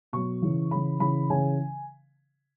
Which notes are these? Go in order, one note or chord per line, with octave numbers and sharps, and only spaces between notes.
B2 F#3 C#6
C#3 E3
C#3 E3 B5
C#3 E3 B5
C#3 E3 G#5